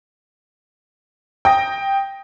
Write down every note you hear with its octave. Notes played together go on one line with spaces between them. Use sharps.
G5 D#6 A#6